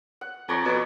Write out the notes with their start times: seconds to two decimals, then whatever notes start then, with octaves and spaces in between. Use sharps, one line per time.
0.21 F#5
0.49 F2 C#5 D5 A#5
0.65 B2 B4 C#5